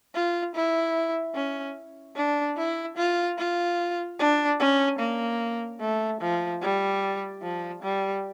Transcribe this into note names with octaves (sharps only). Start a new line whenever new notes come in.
F4
E4
C#4
D4
E4
F4
F4
D4
C#4
A#3
A3
F3
G3
F3
G3